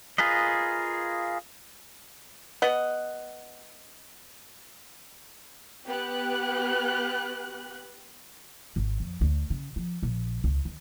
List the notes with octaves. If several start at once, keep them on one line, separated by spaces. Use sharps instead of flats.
F4 G#4 A#4 B4 D#5
B3 D#5 F#5
B3 G4 F#6
G#1
F2
D2
C#3
F3
A#1
C#2
D#3